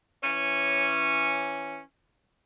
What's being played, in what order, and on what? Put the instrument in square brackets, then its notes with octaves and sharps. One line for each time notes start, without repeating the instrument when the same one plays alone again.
[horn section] E3 C#4